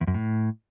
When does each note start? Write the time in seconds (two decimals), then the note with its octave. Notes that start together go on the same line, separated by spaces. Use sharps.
0.01 E2
0.07 F#2
0.14 A2